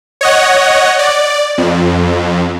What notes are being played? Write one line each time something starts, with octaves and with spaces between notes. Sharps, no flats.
C#5 D#5 F#5
D5
F2